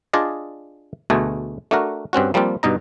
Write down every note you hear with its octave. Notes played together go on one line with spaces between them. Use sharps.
D4 F4 G#4 D5 D#5
D2 B2 A3 G#4
A3 D4 F#4 A#4
G2 C4 C#4 F#4
F3 G3 A#3 C4 F4
G2 B2 D#4 A#5